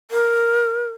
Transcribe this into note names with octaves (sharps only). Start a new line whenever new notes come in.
A#4